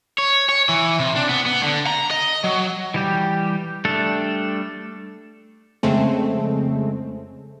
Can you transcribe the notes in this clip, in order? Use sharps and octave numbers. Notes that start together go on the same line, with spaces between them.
C#5
C#5
E3
C3
D4
B3
B3
D3
A#5
D#5
F#3
E3 G3 G4
G3 A3 D4 A4
F2 C#3 G#3 A3 C4